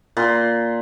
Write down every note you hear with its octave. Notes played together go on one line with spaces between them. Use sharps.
A#2 C6